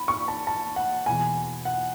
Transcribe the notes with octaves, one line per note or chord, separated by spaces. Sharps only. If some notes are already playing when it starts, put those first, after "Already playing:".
Already playing: B5
C#6
A5
A5
F#5
E2 B2 G#5
F#5